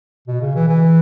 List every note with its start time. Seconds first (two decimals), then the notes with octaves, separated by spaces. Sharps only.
0.28 B2
0.41 C#3
0.55 E3
0.68 E3